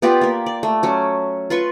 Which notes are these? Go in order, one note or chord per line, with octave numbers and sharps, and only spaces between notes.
B3 F4 G4 D5
A#3 A#4
D5
A3
F#3 C#4
F4 B4 C6 C#6